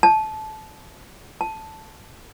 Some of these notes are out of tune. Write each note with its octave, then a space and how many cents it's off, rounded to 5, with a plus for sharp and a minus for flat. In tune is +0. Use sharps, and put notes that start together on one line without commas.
A5 -20
A5 +0